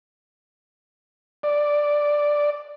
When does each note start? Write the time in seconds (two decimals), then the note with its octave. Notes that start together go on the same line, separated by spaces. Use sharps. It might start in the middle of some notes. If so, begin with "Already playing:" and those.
1.43 D5